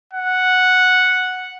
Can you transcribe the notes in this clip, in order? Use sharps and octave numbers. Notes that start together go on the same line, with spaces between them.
F#5